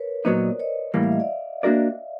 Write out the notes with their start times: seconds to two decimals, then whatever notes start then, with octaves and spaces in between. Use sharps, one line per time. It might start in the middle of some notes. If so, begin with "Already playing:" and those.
Already playing: A#4 B4 C#5
0.25 A#2 F#3 B3 D#4 C5 D5
0.60 C#5 D#5
0.94 A2 E3 G3 A#3 F5
1.03 E5
1.12 D#5
1.20 D5 E5
1.63 A#3 D4 F#4 A#4 D5